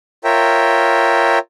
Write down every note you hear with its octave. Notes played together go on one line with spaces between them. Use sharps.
F4 A#4 C#5 E5 G5